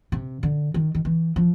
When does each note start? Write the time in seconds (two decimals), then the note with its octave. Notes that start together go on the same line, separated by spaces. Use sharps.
0.12 C3
0.43 D3
0.74 D#3
0.95 D#3
1.05 E3
1.36 F3